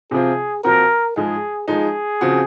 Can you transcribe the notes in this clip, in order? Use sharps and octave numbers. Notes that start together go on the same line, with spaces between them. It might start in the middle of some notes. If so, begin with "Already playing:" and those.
C3 F3 C4 F4 G#4
A#2 F3 C4 F#4 A#4
G#2 F3 G#3 G#4
F3 G#3 D#4 G#4
C#3 F3 C4 F#4